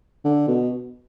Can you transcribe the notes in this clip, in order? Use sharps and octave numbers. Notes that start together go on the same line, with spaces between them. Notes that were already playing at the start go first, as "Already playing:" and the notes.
D3
B2